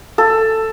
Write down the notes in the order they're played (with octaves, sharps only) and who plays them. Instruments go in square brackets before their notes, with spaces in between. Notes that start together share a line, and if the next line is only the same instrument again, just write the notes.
[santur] A4